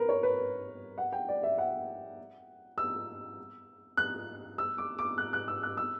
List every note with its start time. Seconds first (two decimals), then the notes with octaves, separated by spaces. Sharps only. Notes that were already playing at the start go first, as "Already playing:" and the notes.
Already playing: A#4 B4
0.09 C#5
0.23 B4
0.98 F#5
1.13 G5
1.28 D5
1.43 E5
1.58 F#5
2.78 E6
3.97 F#6
4.58 E6
4.78 D6
4.99 D6
5.18 F#6
5.33 F#6
5.48 E6
5.63 F#6
5.77 E6